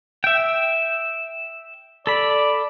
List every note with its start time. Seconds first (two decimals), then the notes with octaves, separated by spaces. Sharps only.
0.24 E5 G5
2.07 A4 D5 B5